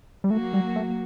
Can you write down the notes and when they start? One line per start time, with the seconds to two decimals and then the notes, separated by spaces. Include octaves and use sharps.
0.24 G3
0.30 F#3 A3 A#3 F#4
0.53 G3
0.76 A3